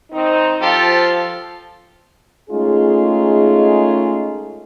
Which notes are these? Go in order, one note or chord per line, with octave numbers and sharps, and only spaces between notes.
D#3 C4 D#4
F3 F4 G4 A4
G#3 A3 C#4 D#4 F4 G#4